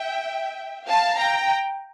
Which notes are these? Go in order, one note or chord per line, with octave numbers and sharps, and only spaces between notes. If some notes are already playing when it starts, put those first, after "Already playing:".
Already playing: E5 G5
F5 A5
G5 A#5